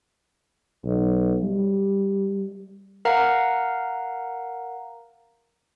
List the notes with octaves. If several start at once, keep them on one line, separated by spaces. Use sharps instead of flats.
B1
G3
A#4 F5 F#5 A#5